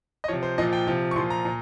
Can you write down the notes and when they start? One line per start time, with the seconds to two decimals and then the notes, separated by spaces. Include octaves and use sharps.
0.24 D#5
0.28 C3 F3 C#5
0.43 C5
0.58 A#2 F3 D#5
0.73 G5
0.87 C3 F3
1.11 C#6
1.16 A#2 F3 C6
1.30 A#5
1.45 A#2